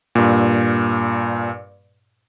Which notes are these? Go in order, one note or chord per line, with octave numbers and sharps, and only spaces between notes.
G2 A#2